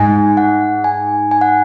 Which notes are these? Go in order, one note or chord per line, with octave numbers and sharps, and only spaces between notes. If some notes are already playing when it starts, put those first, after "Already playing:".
Already playing: G#2 G#5
F#5
G#5
G#5
F#5